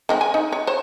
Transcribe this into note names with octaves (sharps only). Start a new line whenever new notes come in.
D#3 G#3 C4
G#5
D#4
C#5
C5 C#5